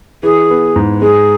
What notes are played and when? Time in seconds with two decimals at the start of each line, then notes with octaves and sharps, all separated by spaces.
0.23 E3 G#4
0.50 B3
0.76 G#2
1.01 G#3 G#4